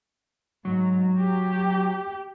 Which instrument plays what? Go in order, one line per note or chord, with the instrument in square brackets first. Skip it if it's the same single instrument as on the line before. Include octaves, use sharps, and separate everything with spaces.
[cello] G#2 [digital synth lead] F#3
[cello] G4